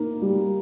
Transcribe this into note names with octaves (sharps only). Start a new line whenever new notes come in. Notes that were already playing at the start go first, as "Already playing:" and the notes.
Already playing: A#3 D#4
G3